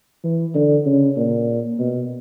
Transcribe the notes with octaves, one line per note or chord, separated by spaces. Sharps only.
E3
D3
C#3
A#2
B2